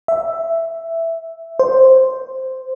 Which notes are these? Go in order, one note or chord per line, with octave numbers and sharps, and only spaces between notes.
E5
C5